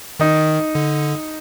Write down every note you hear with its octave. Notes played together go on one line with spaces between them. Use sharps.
D#3 D#4
D3